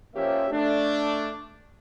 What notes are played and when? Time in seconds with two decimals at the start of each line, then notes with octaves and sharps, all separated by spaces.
0.15 F3 A#3 C#4 G4 C5 E5
0.51 A3 D4